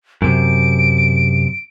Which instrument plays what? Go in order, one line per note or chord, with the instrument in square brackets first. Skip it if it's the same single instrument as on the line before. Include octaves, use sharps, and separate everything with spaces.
[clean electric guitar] F#2 C3 [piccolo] D7